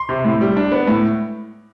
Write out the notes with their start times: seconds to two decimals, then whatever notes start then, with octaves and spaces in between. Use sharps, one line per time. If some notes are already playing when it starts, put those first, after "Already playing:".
Already playing: C6
0.09 C3
0.25 A2
0.41 G3
0.57 D4
0.72 B3
0.87 A2